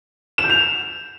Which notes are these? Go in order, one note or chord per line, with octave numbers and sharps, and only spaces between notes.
E7
G6
F7